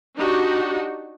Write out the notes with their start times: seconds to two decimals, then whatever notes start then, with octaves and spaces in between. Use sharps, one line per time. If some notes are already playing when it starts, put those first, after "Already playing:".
0.17 D4 D#4 F#4 G4